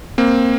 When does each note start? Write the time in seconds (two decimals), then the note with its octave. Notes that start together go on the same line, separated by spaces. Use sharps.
0.18 A#3 C4